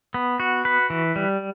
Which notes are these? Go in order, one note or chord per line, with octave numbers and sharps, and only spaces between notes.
B3
F#4
B4
E3
G3